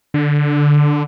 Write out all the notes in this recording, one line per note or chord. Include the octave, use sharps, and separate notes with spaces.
D3